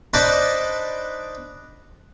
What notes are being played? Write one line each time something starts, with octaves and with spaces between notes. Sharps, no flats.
D4 D#4 B4 C5 D5 A5